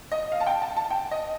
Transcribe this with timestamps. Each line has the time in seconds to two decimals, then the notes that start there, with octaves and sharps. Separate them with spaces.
0.12 D#5
0.32 F5
0.40 A5
0.47 G5
0.62 A5
0.77 A5
0.91 G5
1.11 D#5